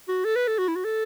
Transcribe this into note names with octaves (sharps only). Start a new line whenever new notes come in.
F#4
A4
B4
A4
F#4
E4
F#4
A4